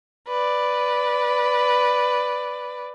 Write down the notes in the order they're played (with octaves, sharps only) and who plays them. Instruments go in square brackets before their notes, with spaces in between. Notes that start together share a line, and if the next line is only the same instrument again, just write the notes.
[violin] B4 D5